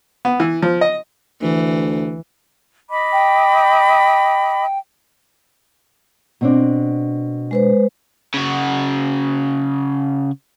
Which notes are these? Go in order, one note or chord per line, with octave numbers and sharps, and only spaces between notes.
B3
E3
F3
D#5
D2 E3
D#5 B5 D6
G5
B2 C4 D4
G#3 B4 C5
C#3 F#4